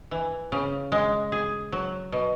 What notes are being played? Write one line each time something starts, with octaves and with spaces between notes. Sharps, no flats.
E3
C#3
G#3
G#4
F#3
B2